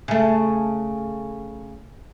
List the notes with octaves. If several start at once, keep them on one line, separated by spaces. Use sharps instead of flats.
C#3 A3